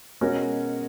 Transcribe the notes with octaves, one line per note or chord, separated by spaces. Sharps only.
B2 G#3 C#4 F#4 A#4